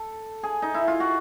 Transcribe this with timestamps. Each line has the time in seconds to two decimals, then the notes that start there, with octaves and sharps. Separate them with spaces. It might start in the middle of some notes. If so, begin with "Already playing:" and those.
Already playing: A4
0.43 G#4
0.62 D#4
0.75 E4
0.88 F4
1.00 F#4